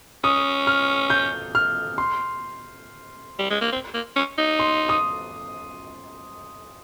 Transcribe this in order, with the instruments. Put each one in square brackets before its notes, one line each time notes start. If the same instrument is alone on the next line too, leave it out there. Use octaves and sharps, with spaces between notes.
[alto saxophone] C#4 [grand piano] D#6
[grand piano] F6
G6
F6
C6
[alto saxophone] G3
G#3
A#3
C4
A#3
C#4
D#4
[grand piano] C6
D#6